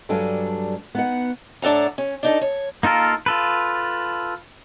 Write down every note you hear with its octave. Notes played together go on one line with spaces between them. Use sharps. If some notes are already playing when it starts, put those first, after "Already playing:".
G2 F#3 G3 D4 A4 G#5
B3 D#4 F#5
A2 D4 A4 F#5 A#5
C#4
D4 D#4 A4
C#5
A#3 D#4 F4 A4 A#4
F4 A4 B4